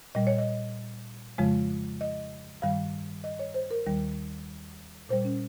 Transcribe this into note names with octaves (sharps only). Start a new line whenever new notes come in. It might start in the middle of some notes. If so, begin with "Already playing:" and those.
A#2 G3 D#5
C#5
D#5
F2 C#3 F3 G#3
D#5
G2 D#3 G3 F5
D#5
C#5
C5
A#4
D#2 D#3 G3
A#2 G3 C5
C#4